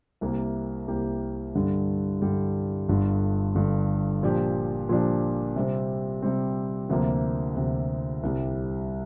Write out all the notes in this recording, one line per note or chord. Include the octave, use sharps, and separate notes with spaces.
C2 C3 A#3 G4 A#4
C2 C3 A#3 G4 A#4
G2 D3 G3
G2 D3 G3
G1 G2 D3
G1 G2 D3
A#2 F3 D4 G4
A#2 F3 D4 G4
C3 G3 C4
C3 G3 C4
D2 C3 F3 A#3
D2 C3 F3 A#3
C2 C3 G3